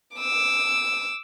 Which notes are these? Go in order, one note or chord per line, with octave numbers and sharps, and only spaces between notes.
D6 E6